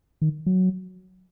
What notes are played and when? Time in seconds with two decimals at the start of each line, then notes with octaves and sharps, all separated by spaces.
0.22 D#3
0.46 F#3